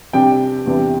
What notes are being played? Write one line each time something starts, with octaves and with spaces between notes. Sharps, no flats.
C3 G3 D4 G5
E2 C3 E3 G3 D4